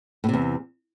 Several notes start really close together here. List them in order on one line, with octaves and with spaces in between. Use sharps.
A2 C3 E2